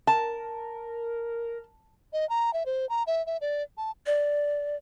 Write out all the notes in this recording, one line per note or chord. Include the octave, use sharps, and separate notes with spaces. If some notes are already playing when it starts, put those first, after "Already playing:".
A#4 A5
D#5
A#5
E5
C5
A#5
E5
E5
D5
A5
D5